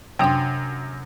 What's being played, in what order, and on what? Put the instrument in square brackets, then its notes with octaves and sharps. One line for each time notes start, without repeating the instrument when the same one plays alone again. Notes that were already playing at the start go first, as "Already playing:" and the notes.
[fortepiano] F#2 [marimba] C3 D4 C6 [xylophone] G5 D#6